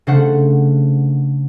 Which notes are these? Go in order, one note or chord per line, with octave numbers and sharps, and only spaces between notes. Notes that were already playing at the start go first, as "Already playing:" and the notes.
C#3 A3 D4 C5 F#5